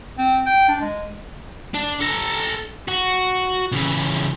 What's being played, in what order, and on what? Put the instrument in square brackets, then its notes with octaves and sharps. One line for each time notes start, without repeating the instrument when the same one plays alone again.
[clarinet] C4
G5
D4
G#3
[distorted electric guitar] D4
A4 A#5
F#4
C#3 E3